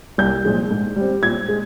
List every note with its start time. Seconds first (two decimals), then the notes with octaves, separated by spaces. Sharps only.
0.18 C2 G6
0.45 A#2 F3 G#3
0.71 G#2
0.96 G3 C4
1.23 A#2 G#6
1.49 G#3